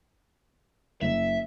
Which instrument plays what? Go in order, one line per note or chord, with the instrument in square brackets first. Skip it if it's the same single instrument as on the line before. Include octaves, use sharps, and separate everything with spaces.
[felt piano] F#1 [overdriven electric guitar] E5